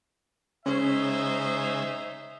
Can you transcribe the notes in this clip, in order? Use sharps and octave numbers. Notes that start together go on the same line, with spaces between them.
C#3 G#3 C#4 D#4 C5 C#5 E5